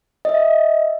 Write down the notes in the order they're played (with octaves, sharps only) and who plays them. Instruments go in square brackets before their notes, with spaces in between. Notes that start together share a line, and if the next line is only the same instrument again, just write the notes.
[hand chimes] D#5 E5